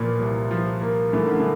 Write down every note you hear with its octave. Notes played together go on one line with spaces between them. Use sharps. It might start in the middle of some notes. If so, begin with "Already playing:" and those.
Already playing: A#2 E3 F3 A#3
C2
F3
A#3
E3 A3
D3
E3